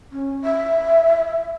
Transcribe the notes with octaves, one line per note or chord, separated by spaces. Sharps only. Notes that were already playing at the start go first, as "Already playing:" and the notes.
C#4
E5